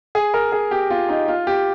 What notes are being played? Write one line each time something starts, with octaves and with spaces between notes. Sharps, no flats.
G#4
A#4
G#4
G4
F4
D#4
F4
G4